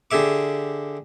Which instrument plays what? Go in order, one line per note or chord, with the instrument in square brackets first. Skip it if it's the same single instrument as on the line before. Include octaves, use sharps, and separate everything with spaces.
[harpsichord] D3 G4 G#4 E5 D6